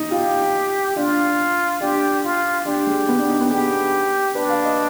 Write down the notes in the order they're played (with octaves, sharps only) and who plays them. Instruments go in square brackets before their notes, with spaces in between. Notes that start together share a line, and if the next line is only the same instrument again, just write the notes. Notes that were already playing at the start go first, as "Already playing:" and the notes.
Already playing: [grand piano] D#4
[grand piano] F4 [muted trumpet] G4
[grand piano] D4 [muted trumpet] F4
[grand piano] D4 [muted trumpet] G4
[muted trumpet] F4
[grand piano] D4 [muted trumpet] G4
[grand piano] G#3
B3
D4
D#4
B3
[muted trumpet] G4 [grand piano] G#4
[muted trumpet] D4 [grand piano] B4
[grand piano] F5
D#5